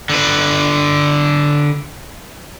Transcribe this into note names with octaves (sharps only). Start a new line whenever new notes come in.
D3 B4